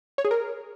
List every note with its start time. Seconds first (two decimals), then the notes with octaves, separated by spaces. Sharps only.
0.18 C#5
0.25 G#4
0.31 A#4